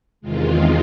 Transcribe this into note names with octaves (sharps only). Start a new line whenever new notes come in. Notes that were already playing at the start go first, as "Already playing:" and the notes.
E2 C3 D#3 G#3 F4